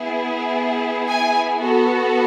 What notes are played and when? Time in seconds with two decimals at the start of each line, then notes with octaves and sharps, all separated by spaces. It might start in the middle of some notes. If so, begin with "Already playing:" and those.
Already playing: B3 E4 G#4
1.07 G#5
1.58 B3 F#4 A4